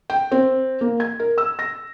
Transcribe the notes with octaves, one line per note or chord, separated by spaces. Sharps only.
G5
C4
A#3
G#6
A#4
E6
A#6